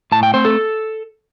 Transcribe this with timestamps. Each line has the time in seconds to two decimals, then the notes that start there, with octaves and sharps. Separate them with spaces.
0.12 A2 A5
0.23 G5
0.34 A3 C4 C5
0.45 A4